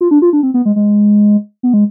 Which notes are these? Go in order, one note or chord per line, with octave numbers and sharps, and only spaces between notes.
F4
D4
F4
D4
C4
B3
G#3
G#3
B3
G#3